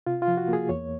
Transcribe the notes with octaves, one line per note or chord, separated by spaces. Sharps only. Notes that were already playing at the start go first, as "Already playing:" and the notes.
C3 F4
F4
F3
F#4
A#3 G#4
E2 C#5